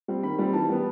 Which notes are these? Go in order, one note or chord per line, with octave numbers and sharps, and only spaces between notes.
G3 C4
D#3 B5
G3 C4
E3 A5
G3 B3